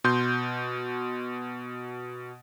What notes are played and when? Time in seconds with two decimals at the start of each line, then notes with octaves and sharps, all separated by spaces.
0.04 B2 C6 G6